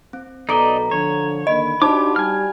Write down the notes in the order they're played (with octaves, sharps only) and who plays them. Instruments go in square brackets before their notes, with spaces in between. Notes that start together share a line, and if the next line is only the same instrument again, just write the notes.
[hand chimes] C4
[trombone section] B1 B3 [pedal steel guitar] D#4 D5 D#5 [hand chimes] A4 A#5
[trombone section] D3 F3 [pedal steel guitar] C#5
[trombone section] D3 D#3 A#3 [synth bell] D#5 [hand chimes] B5
[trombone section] D4 F#4 C5 [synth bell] D#4 A5 [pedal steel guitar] G4 D6
[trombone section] G3 F#4 [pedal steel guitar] G#5 F6